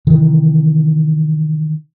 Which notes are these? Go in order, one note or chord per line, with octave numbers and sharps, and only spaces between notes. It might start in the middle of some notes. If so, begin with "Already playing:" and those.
C3 D#3 E3